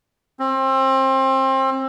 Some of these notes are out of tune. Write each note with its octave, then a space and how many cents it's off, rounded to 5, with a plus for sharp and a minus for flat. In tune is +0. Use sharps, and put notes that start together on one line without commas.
C4 +30